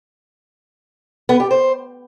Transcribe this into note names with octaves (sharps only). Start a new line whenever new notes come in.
B3
G4
C5